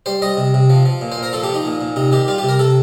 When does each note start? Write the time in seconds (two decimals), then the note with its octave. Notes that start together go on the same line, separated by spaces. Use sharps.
0.06 G3 C5
0.22 G3 D#5
0.37 C3
0.54 C3
0.70 F3
0.86 F3
1.01 A#2
1.12 C5
1.18 A#2
1.23 A#4
1.33 F3 A4
1.43 G4
1.49 F3
1.54 D#4
1.65 A#2
1.81 A#2
1.96 C3 D#4
2.12 D#3 G4
2.28 G3 F4
2.38 C3 G4
2.48 A#4
2.59 C3 A4